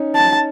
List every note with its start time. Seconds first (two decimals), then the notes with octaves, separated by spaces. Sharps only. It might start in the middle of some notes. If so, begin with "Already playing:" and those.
Already playing: C#4 D#4
0.15 A5